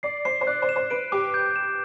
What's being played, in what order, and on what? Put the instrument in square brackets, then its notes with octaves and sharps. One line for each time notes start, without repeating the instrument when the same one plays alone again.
[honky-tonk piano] D5 [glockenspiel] C7
[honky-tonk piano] C5 [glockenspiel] C7
[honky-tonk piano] C5
[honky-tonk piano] D5 [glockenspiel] F#6
[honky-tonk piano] C5
[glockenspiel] E7
[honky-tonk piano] C5
[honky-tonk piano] B4 [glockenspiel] D7
[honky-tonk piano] G4 [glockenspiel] D6
[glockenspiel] G6
E7